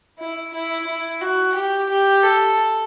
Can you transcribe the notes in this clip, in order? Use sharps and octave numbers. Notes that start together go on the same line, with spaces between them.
E4
E4
E4
F#4
G4
G4
A4